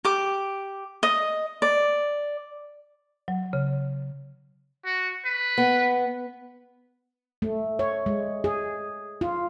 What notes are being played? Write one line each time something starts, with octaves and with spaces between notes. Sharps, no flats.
G4 D6
D#5
D5
F#3
C#3
F#4
B4
B3
A3
C#5
G#3
G#4
F4